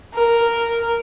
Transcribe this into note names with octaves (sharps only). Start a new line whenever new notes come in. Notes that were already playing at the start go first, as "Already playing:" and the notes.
A#4